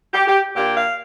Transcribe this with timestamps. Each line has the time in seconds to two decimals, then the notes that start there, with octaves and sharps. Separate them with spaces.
0.14 G4
0.28 G4
0.55 A#2 A#3 D4 G4
0.75 F5